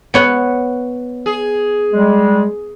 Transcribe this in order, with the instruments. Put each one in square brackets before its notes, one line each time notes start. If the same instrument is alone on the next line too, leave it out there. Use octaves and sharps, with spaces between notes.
[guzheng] B3 C#5 F#5
[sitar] G#4
[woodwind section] G3 G#3